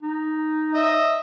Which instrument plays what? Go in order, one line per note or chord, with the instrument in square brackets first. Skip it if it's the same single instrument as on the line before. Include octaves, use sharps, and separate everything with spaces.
[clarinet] D#4
[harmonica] D#5 E5